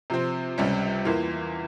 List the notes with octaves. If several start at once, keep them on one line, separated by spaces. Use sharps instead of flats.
C3 F3 C4
C#2 C3 G3 C#4
E2 E3 A#3 F4